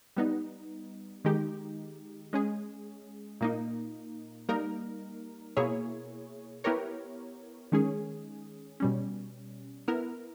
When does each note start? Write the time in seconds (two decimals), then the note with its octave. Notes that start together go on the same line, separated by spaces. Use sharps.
0.17 G3 B3 D#4
1.25 D#3 G#3 D#4 G4
2.33 G#3 C#4 G#4
3.41 A#2 A#3 D#4
4.49 G3 A#3 D#4 A#4
5.57 B2 A#3 E4 G#4 C#5
6.64 B3 E4 G4 A#4 C#5
7.72 D#3 G#3 C#4 G#4
8.80 B2 G3 C#4
9.88 B3 E4 A#4